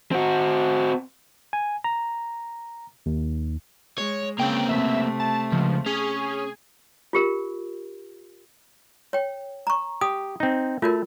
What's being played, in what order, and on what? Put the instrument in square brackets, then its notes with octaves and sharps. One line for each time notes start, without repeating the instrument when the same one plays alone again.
[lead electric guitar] C4 F#4
[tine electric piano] G#5
A#5
D#2
[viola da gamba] G#3 [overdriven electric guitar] C#5
[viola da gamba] C#3 [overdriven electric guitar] A#3 C4 [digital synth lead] G5
[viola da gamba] C3 A3 [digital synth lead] E5
[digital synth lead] A5
[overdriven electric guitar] C#2 [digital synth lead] F3
[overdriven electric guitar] C#4 [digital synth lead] G#4
[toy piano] F4 G4 A#4
C#5 G5
A#5 C#6
[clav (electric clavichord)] G4 [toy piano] D#6
[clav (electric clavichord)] C4 D#4
[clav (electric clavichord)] A3 [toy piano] F4 F#4 A#4